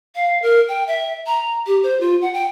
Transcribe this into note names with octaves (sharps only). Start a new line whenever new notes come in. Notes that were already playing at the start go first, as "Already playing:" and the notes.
F5
A#4
G5
E5
A#5
G4
C5
F4
F#5
G5